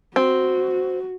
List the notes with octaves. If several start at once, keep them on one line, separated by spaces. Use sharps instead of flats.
C4 F#4